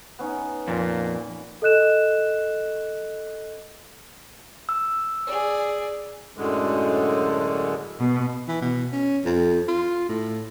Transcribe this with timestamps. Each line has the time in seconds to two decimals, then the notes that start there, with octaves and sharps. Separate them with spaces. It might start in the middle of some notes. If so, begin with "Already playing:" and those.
0.19 B3 C#4 D#4
0.68 F2 A#2
1.62 A4 D#5 F#6 E7
4.69 E6
5.27 G#4 D5
6.37 F#2 A2 D3 G#3
7.99 B2
8.48 E3
8.62 B2
8.93 C#4
9.24 F2
9.68 F4
10.09 A2